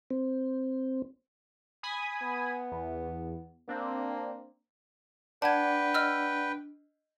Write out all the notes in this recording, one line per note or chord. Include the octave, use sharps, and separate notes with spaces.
C4
G#5 B5 D#6
B3
E2
A#3 C4 D4
D4 B4 D5 F#5 G5 A5 G#6
D#5 E6 F6